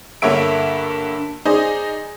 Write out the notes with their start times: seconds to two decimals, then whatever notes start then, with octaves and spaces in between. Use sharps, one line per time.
0.22 G2 D3 A#3 C#5 E5 D7
1.46 D#4 G#4 C5 D5 D#5